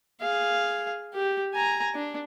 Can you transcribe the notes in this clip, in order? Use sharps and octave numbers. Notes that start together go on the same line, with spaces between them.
G#4 F5
G4
G#5 A#5
D4